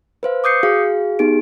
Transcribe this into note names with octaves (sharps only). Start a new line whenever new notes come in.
B4 C5 F5
D6 D#6 G6 C7 C#7
F#4 G#4 F5
B3 D#4 G4 G#4 D7